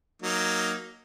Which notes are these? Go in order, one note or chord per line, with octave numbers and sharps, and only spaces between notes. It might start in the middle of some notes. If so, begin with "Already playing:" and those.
F#3 A#3 D#4